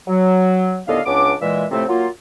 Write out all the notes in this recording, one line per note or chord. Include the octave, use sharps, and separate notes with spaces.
F#3
D#2 A2 D3 B3 D#5 F5
C#2 B3 C#4 D4 D6
A#2 E3 G#3 E5
A2 C3 F3 A3 C4
F#3 A#3 F4